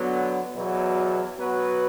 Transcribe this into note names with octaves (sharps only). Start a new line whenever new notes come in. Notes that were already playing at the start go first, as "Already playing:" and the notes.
Already playing: D3 F#3 B3
E2 B2 F#3
F#3 B3 F#4 B4